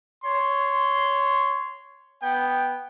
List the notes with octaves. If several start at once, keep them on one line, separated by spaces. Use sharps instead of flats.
C#5 C6
B3 G5